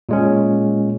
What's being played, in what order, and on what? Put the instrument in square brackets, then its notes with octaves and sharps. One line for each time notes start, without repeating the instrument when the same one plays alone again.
[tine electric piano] A#2 G#3 C#4